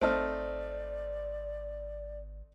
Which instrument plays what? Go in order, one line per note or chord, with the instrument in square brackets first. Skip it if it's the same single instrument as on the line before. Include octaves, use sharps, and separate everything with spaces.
[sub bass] G#1 [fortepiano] A3 C4 D#4 [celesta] C5 A5 F6 [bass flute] D5